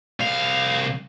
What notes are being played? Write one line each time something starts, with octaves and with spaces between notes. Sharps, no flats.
C2 F5